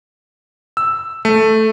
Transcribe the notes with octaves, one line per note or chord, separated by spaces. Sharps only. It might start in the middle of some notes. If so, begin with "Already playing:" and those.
E6
A3